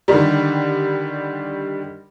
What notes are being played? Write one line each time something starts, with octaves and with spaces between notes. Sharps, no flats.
D3 D#3 G3